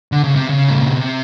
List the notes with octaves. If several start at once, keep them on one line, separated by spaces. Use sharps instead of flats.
D3
C#3
C3
C#3
A2
A#2
B2
C3